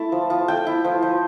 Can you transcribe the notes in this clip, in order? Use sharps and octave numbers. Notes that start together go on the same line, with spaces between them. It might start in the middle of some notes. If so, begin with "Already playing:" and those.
Already playing: A3 E4 A5
F3
F3
A3 G5
E4
F3
F3